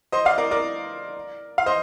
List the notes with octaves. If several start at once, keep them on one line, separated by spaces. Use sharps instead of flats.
C5 D#5
D5 F5
A#4 D5
A#4 D5
F5
C5 D#5